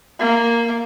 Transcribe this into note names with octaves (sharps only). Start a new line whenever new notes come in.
A#3